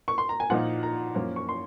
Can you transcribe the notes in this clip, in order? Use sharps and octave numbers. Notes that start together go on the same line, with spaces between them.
C#6
C6
A#5
G#5
A#2 F3 A#3 D#4 F#5
A#5
F#2 F3 A#3 C#4
C#6
C6